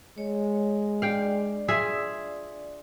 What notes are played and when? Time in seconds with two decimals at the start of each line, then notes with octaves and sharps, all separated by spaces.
0.18 G#3 C#5
1.02 D4 D5 F5 G5
1.68 F4 G#4 E5